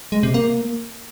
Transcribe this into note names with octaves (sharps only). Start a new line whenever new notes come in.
G#3
C3
A#3